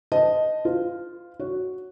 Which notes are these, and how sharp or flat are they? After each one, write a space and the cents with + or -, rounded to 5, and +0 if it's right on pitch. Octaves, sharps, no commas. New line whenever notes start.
C5 -40 D#5 +0 A5 +0
F4 +0 C5 -40
F#4 +0 C#5 +0